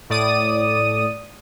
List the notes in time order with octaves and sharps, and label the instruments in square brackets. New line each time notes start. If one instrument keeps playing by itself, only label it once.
[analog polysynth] A2 D5 D#6 D#7